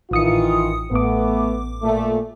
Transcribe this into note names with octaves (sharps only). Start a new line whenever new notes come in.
A1 D#3 E3 F4 D#6 C#7
A1 A3 B3 D6
A#2 A3